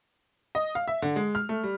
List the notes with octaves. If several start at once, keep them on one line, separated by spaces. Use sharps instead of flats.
D#5
F5
E5
D3
G#3
F6
A3
G3